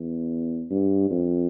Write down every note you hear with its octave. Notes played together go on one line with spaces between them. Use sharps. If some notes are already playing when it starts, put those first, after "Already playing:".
Already playing: E2
G2
F2